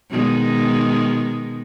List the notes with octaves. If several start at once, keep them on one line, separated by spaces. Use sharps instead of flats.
B2 D#3 G#3